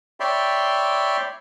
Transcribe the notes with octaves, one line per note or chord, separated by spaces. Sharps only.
C#5 D5 E5 G5 B5 C6